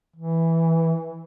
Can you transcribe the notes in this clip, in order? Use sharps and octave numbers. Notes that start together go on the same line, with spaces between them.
E3